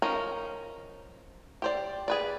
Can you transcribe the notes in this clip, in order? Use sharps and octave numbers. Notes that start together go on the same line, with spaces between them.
F3 C#4 D#4 A#4
G4 C5 D5
G#4 B4 D5